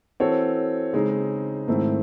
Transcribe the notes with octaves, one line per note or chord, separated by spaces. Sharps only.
E3 C4 F#4 A4 C#5
C#3 G#3 C4 D#4
G#2 D#3 A3 C4 E4